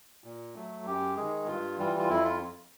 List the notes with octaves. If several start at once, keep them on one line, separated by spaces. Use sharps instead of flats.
A#2
F#3 A3
F#2 G4
D#3 G#3 G#4
G2 F4
E3 G3 F4
F4
F2 E4
F4